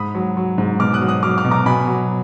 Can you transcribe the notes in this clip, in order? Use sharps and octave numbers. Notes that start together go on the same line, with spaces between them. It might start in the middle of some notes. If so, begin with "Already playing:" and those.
Already playing: G#2 B5 D#6
F#3
F#3
G#2
B2 D6 F6
D#6 F#6
F#3
D#6 F#6
F#3 D6 F6
D6 F6
B2
A#5 D6
B2 G#5 B5
F#3